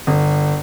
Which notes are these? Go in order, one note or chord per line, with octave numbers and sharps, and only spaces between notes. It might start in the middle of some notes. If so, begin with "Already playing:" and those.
G1